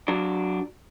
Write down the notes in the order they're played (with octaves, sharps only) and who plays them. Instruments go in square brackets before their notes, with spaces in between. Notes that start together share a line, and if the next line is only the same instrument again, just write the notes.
[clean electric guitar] F#3 D4